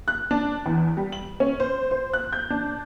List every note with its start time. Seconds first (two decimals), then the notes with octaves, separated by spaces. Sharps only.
0.08 F#6
0.31 D4
0.66 E2
0.97 G3
1.12 F#7
1.40 C#4
1.60 C5
1.91 C5
2.13 F#6
2.33 G6
2.50 D4